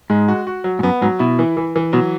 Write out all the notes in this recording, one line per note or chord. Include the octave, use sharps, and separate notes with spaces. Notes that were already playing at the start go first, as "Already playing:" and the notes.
G#2 G#3
F#4
F#4
F#3
G#2
F#2 B3
G#2 F#3
B2 E4
E3
E3
E3
B2 F#3